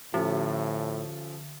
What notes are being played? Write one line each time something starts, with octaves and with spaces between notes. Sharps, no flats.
A2 D3 F3 C#4 A4